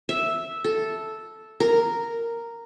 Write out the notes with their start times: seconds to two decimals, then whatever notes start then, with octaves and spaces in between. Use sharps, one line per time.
0.09 E5
0.64 A4
1.60 A#4